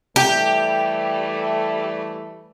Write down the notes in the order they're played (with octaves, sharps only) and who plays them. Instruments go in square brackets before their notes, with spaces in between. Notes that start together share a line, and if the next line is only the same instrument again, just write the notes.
[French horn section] E3 G3 A3 [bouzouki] G4